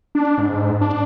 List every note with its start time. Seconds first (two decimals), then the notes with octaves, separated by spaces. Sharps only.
0.15 D4
0.38 G#2
0.81 D4